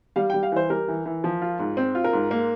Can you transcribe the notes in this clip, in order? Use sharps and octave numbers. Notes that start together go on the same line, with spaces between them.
G3 F5
G3 G5
F5
E3 C5
G3 A#4
E3
E3
F3
F4
G#2
C4
F4
A#4
G#2
A#3